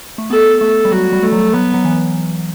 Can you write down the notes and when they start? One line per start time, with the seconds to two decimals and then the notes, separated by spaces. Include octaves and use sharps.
0.18 A3
0.30 B3 A4
0.61 A3 A4
0.85 G3
0.91 F#3 F#4
1.13 G3
1.23 A3
1.32 F#3
1.53 F#3 B3
1.74 F#3
1.84 E3